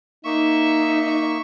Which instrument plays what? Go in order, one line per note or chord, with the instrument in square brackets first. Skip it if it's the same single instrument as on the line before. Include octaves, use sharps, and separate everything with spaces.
[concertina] A#3 C#6 [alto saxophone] D#4 [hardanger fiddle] E5